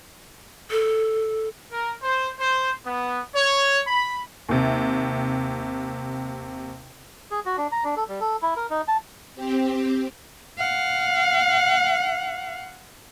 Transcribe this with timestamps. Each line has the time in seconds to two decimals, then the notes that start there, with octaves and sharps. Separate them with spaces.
0.71 A4
1.72 A#4
2.03 C5
2.40 C5
2.86 B3
3.35 C#5
3.87 B5
4.49 D#2 C3
7.31 G#4
7.46 F#4
7.58 D4
7.72 A#5
7.84 D4
7.97 A4
8.08 G3
8.21 A4
8.42 E4
8.57 A#4
8.70 D#4
8.88 A5
9.35 C4 G4
10.58 F5 F#5